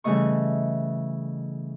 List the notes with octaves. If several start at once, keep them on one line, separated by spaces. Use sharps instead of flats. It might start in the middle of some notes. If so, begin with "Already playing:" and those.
C#3 E3 G3 A3 D#5 C#6